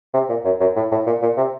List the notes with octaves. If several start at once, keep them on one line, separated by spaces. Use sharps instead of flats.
C3
A#2
F#2
F#2
A2
A2
A#2
A#2
C3